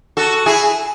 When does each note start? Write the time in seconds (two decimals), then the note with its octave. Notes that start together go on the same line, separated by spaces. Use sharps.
0.17 F#4 A4
0.46 E4 G#4